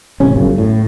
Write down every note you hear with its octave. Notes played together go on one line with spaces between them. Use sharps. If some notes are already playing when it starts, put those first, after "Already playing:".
A1 C3 C#4
G1 F#2 C#3
A2